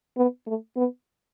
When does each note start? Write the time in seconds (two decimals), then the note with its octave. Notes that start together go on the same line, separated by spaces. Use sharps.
0.17 B3
0.47 A3
0.77 B3